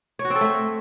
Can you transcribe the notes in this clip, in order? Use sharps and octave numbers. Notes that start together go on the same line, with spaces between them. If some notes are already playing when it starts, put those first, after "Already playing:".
C#5
F#4
C4
A4
A3